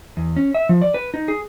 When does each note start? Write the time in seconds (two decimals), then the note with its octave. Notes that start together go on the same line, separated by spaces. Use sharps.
0.17 E2
0.36 C#4
0.54 E5
0.69 F3
0.82 D5
0.94 B4
1.14 D#4
1.28 G#4